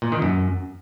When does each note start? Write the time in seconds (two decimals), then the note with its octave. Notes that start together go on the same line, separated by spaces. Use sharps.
0.02 A#2
0.12 D#3
0.22 F#2